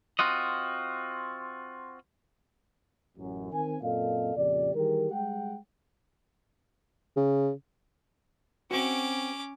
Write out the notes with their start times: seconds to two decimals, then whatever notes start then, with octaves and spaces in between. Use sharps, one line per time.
0.19 C4 F4 F#4 D#5
3.17 A1 F#2
3.52 D#3 C4 A#4 G#5
3.82 F#2 A#2 C4 A4 D#5 F5
4.36 F2 A#2 C#3 G4 D5
4.74 D#3 E3 G3 G4 G#4 A#4
5.12 G3 G#3 F#5 G5
7.17 C#3
8.71 C4 C#4 F#4 D6